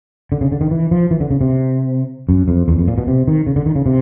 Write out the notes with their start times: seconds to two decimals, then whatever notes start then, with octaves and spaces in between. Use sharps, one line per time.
0.32 D3
0.41 C#3
0.52 D3
0.61 D#3
0.71 E3
0.91 F3
1.11 E3
1.21 D3
1.31 C#3
1.41 C3
2.29 F#2
2.48 F2
2.68 E2
2.78 F2
2.88 A#2
2.98 B2
3.07 C3
3.28 D#3
3.47 C#3
3.56 D3
3.66 D#3
3.76 C#3
3.86 C3